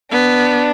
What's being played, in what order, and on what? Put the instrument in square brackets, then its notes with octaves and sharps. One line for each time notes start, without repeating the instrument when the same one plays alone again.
[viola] B3 [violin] D4